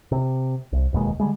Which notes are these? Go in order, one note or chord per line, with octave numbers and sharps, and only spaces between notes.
C3
C2
E1 D#2 B2 G#3
D3 G3 G#3